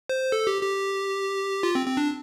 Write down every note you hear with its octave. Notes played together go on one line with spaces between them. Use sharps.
C5
A4
G4
G4
F4
C4
C4
D4